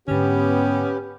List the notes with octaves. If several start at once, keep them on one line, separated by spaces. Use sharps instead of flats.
G#2 D3 B3 C#4 G4